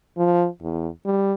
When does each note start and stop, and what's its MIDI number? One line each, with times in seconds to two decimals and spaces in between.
0.18 0.47 53
0.62 0.89 40
1.06 1.34 55